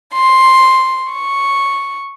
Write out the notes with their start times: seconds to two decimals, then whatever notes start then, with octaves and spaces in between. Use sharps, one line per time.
0.13 C6
1.12 C#6